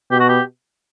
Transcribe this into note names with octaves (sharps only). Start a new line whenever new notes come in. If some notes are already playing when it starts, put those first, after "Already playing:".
B2 G4
F#4
G4